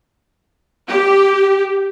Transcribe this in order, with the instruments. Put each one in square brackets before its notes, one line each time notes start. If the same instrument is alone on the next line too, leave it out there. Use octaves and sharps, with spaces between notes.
[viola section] G4